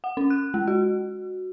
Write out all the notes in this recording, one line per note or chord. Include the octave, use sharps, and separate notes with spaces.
F#5
C#4
F#6
G#3
F#4